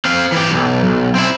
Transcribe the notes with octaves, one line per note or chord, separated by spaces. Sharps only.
C4 F5
E3 G4
B1
B1
C4 E4